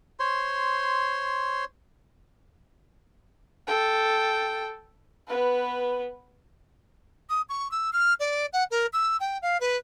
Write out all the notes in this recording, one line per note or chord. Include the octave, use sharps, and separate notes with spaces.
C5 C#5 C6
A4 G5
B3 B4
D#6
C#6
E6
F6
D5
F#5
A#4
E6
G5
F5
B4